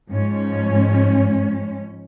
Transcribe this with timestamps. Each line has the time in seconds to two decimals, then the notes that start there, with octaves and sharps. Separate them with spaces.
0.10 G#2 F3 G#3 C#4